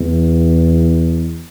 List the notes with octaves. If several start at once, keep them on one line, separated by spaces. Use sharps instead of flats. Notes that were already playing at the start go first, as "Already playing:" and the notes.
Already playing: E2